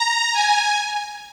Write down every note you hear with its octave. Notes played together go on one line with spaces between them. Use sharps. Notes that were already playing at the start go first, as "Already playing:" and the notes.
Already playing: A#5
G#5